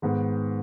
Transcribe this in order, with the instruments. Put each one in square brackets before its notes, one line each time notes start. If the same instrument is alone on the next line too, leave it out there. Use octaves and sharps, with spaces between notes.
[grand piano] G#2 D#3 G#3 B3